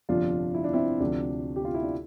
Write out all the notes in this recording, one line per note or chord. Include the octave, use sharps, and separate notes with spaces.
G1 F2 C3 F3 D4 F4
E4
D4
C4 E4
D2 C3 F3 D4
G4
F4
E4
D4